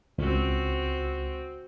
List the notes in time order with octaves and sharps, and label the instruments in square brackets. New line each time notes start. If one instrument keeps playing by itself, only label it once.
[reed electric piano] C#2 [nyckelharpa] C4 F#4